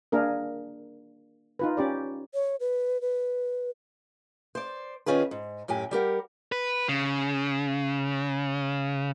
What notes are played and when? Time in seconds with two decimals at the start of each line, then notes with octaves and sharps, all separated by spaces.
0.12 A#3 D4 G#4 A#4
1.59 D#4 F4 B4
1.77 C#4 G4 D5
2.34 C#5
2.60 B4
3.01 B4
4.55 C5 D5
5.06 D#3 C#4 F4 G#4 B4
5.31 G#2
5.68 F#2 A2 G4 G#5
5.91 G3 G4 A#4 F#5
6.52 B4
6.89 C#3